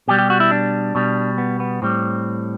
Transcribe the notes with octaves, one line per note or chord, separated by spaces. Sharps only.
B2 G3 G4
G4
F#4
E4
D4
B2 G3
B3
B3
A2 G3 C4